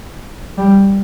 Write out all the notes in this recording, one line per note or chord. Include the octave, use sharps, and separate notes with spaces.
G3